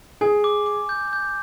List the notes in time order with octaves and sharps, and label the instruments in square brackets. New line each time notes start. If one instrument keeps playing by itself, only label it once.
[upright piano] G#4 [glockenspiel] G#5
[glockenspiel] D6
D6
G6
G6